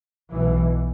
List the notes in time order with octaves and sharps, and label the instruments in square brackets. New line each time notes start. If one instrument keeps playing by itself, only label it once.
[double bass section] B1 B2 E3